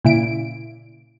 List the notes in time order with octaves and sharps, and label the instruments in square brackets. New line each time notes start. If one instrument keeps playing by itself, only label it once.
[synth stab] A#2 C#3 E4 D7